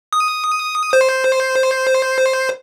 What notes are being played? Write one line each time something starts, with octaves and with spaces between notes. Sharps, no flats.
D#6
C5